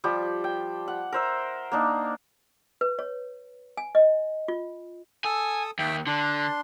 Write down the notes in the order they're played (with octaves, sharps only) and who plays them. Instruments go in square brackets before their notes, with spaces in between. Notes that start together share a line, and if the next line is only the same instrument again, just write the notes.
[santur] F3 G3 G4
G5
F#5
A#4 C5 E5
A#3 D4 D#4
[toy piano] B4
C#5
G#5
D#5
F4
[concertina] A4 D#6 E6 [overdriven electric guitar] G#5
[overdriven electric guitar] D#2 [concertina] E5 G5
[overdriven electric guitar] D3 [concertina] D4 C6